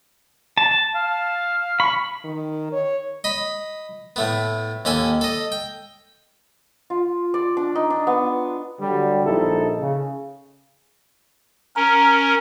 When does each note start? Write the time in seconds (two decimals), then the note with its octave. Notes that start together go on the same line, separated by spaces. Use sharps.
0.58 A5
0.95 F5
1.80 B5 C#6
2.24 D#3
2.72 C#5
3.24 D#5 B5
4.16 A2 A3 B3
4.85 D#2 C#4 A4 G#5
5.21 A4 D#5
5.52 G5
6.90 F4
7.34 D5
7.57 D4
7.75 D#4
7.90 D4
8.07 B3
8.81 D3 F#3 G3
9.25 A#1 D#4 E4 A4
9.80 C#3
11.76 C#4 A#4 A#5